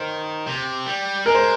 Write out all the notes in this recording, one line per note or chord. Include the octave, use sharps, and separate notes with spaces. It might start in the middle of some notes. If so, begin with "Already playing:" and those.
Already playing: D#3 C5
C3
G3
G#3 A#4
C5